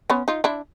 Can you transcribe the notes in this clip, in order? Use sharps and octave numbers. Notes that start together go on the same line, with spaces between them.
B3 C#4
D#4 F4
D4 E4